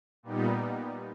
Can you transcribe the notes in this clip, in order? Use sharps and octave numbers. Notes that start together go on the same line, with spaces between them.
A#2 G3 B3 D#4